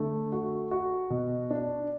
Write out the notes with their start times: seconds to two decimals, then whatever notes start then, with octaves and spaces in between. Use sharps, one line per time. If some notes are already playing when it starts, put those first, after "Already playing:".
Already playing: D3 A3
0.32 F#4
0.71 F#4
1.10 B2
1.51 D4